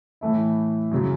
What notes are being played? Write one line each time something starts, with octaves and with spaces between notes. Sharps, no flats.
A2 E3 A3 E4
F#2 C#3 F#3